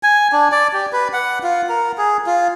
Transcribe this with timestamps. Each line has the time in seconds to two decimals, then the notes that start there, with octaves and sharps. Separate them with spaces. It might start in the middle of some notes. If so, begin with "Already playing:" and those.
0.03 G#5
0.32 D4
0.52 D5
0.73 G4
0.93 B4
1.13 F#5
1.43 F4
1.69 A#4
1.98 G#4
2.27 F4